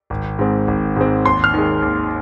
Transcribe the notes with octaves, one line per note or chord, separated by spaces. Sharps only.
G#1
G#2 G#3 C4
G#1
G#2 G#3 C4
D#2 C6
F6
D#3 G#3
D#2